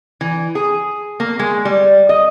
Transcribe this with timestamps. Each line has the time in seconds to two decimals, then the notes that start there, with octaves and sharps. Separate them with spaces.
0.21 E3
0.55 G#4
1.20 A#3
1.39 G#3
1.65 G3
2.09 D#5